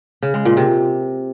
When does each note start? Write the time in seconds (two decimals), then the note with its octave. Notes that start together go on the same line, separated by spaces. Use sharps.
0.22 C#3
0.34 G#3
0.45 A#2
0.57 C3